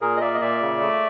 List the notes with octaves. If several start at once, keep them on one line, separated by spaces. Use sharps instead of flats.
A#2 G#4 A#4
D#5
A#3 D5 E5
D#5
A#2 D5 E5
C#3
A3